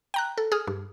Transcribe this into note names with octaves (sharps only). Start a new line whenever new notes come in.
G5 A#5 F#6
A4
G#4 D#6 F6
G2